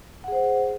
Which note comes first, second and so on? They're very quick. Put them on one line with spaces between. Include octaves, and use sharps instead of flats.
F#5 G#4 C5